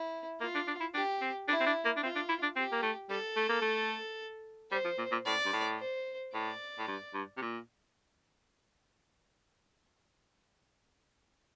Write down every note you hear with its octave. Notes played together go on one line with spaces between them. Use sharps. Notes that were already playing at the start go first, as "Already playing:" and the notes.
Already playing: E4
A#3 F4
D4
D4
E4
D4 G4
C4
D4 E4
C4
D4
A#3
D4
C4 F4
D4
E4
D4
C4 G4
A#3
A3
G3 A4
A3
A#3
A3
G3 C5
F3
A#2
A#2
A2 D5
G2
A2
C5
A2 D5
A2
G2
G2
C3
A#2